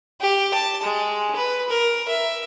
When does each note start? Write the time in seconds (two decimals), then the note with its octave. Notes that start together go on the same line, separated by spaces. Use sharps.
0.21 G4
0.54 A5
0.83 G#3
1.36 B4
1.69 A#4
2.08 E5